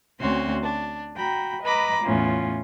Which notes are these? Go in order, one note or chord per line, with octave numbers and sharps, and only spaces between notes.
D2 C4 C#4 F#4 C6
D4
F#4 G5 A#5 B5
B4 D#5 A#5 B5 D6
E2 A2 B3 C#4 F4